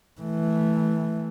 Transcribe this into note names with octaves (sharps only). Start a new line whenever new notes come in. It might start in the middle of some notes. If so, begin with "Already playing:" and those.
E3 A3